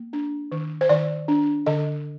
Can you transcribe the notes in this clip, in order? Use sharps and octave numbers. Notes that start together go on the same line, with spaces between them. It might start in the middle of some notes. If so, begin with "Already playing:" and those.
Already playing: A#3
D4
D#3
C5
D#3 D5
D4
D3 D#5